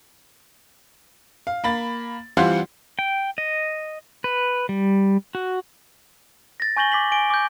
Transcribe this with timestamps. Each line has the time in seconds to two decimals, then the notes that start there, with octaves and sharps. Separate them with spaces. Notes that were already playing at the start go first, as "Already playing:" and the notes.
1.47 F5
1.64 A#3 B5 A6
2.37 E3 G3 C4 F4 F#5 C6
2.99 G5
3.38 D#5
4.24 B4
4.69 G3
5.35 F#4
6.60 A6 A#6
6.76 G#5 C#6 G6 A#6 F#7 G7
6.92 D6 B6 F#7
7.12 G#5 D7 G7
7.30 D6 G6